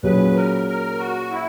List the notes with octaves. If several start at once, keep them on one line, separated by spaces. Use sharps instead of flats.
A#2 F#3 C#4 G#4 B4
A#4
A#4
F#4
E4